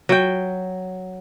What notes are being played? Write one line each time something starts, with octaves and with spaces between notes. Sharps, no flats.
F#3 G5